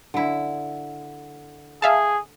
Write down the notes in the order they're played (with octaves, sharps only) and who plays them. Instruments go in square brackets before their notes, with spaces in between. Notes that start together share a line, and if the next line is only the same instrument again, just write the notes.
[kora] D3 E4
[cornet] G#4 [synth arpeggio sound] E5 F5 A5